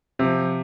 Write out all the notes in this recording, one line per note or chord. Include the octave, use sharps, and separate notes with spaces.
C3 F3